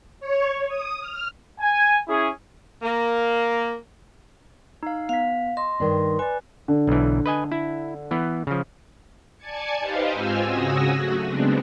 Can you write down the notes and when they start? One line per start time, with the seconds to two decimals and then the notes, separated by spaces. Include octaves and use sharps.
0.20 C#5
0.68 D#6
1.01 F6
1.59 G#5
2.07 C#4 E4 G#4
2.82 A#3
4.83 D#4 F5
5.09 B3 F5 B6
5.57 D#5 C6
5.80 G2 D#3 D4
6.19 B4 D5 G#5
6.68 D3
6.87 B1 E3
7.26 B4 D#5 G#5
7.52 E4
8.11 E3 B3
8.47 C#3 F3
9.37 D5 G#5 A5 G#6 C#7
9.80 D#4 G4 B4 C5 D#5 F5
10.08 G#2 C4 F4 G#5 E6 F6
10.43 C#3 F#4 G#5 D#6 E6 A#6
10.95 F#3 A3 F#4
11.25 C#3 G#3 B3 C4 D4